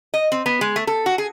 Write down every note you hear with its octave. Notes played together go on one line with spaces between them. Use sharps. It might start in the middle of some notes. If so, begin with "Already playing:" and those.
D#5
C4
B3
G#3
A3
A4
F#4
G#4